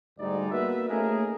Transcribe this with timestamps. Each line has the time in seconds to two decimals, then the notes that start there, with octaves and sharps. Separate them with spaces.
0.18 D2 G#2 G3 G#3 D#4 D5
0.51 A#3 B3 F#4 B4 E5
0.88 A3 A#3 C#4 D#4 G#4 A#4